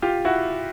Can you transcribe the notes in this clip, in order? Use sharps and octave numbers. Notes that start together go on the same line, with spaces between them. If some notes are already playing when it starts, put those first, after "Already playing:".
F4 G4
E4 F#4